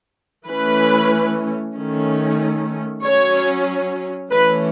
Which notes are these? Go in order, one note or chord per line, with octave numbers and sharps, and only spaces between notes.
E3 A3 C#4 B4
D#3 A3 C#4
F#3 C#4 C#5
E3 A3 C#4 B4